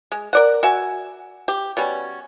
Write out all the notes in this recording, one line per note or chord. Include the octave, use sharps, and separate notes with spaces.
G#3
A#4 D5 F#5
F#4 E5 G#5
G4
B2 G3 C#4